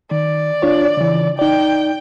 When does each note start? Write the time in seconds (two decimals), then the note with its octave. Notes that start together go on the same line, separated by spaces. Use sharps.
0.11 D#3 D5
0.62 D4 F4 C#5
0.97 C#3 E3
1.39 D#4 D5 G5